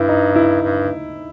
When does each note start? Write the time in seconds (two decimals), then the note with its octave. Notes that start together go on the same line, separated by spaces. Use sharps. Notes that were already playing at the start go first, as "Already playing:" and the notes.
Already playing: G2 E4
0.09 D#4
0.36 E4
0.62 G2